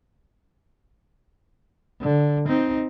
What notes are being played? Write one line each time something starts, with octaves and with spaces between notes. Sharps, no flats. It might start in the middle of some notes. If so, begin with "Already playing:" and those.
D3
C4 D#4